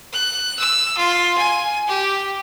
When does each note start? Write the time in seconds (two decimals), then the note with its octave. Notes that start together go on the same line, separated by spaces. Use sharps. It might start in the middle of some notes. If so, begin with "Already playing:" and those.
0.13 F#6
0.59 E6
0.98 F4
1.38 G#5
1.88 G4